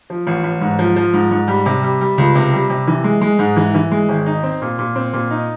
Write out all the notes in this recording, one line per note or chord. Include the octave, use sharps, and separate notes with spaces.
F3
A1
A1
G#2
F3
F3
G#2
G#2
G3
C3
G3
G3
C#2
C3
G3
C3
E3
G#3
G#3
G#2
E3
E3
G#3
G#1
D#4
C4
A#2
A#2
C4
A#2
D#4